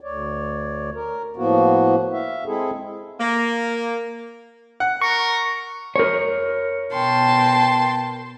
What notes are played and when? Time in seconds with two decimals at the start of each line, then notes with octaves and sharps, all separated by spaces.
0.01 D2 C#5 D5
0.95 A#4
1.37 A2 F3 A#3 B3 F#4
2.13 E5 F5
2.46 G#3 C4 E4 G#4 A4
3.19 A#3
4.80 F#5
5.01 A#4 C#6
5.96 A#4 C#5
6.92 B2 G5 A5 C6